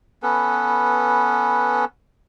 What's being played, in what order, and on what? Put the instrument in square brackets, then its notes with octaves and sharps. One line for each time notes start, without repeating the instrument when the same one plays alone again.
[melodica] B3 C#4 A4 B4